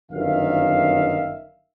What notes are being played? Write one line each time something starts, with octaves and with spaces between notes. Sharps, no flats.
G1 F#2 D#3 E5 F5